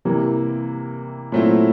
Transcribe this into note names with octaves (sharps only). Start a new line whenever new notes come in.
C3 E3 G3 A#3
A#2 F#3 A3 C4 E4